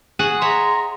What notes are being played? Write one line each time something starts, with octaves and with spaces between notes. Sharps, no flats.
F#4 G#4 F#5
G#4 C#5 E5 A#5 C6